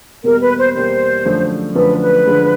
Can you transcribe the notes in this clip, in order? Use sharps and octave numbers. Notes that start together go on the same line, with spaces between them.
E2 B2 G3 A#3 A#4
B4
C5
E2 B2 G3 A#3 C5
F#2 D3 F3 A3
F#2 D3 F3 A3 B4
B4
D3 F3 G#3